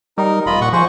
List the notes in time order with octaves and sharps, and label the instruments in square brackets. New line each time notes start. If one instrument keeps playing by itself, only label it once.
[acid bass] G3 [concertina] D#4 A#4
[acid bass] E1 [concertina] F4 D#5 B5
[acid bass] A#2 [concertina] F#5 C#6
[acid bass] F3 [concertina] G#4 C5 C#6